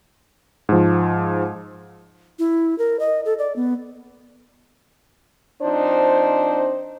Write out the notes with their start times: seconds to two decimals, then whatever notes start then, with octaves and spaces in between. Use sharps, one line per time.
0.69 G#2 F3
2.39 E4
2.78 A#4
3.00 D#5
3.25 A4
3.39 D5
3.56 B3
5.62 F3 C4 D4 D#4 C5